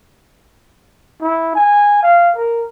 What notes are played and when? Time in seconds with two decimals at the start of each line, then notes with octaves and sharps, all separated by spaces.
1.22 E4
1.55 G#5
2.02 F5
2.36 A#4